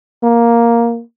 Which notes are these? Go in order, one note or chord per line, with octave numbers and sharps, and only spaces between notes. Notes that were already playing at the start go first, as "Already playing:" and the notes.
A#3